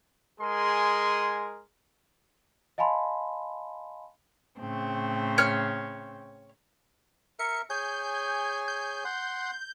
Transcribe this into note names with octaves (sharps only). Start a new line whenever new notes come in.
G#3 G#4 A#4 G#5 C6
D#5 F5 G#5 A5 B5 C6
A2 C#3 C4
C#5 F6
A#4 E5 C#7
G#4 C#5 G#5 G6
G6
F#5 C6